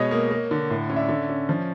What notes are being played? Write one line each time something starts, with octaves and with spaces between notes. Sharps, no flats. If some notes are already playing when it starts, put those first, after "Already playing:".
Already playing: B2 G#3 C#5 D#5
A#3
A#3
D3
A2
C#4
D5 E5
D3
C#4
F3